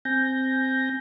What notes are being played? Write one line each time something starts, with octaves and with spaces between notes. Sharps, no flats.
C4 G#5 G6 A#6